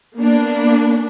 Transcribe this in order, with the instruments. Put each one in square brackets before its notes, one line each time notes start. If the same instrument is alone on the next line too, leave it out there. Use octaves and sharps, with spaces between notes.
[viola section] A#3 B3 D4